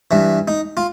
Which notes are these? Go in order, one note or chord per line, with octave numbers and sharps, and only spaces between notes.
G2 E3
D#4
F4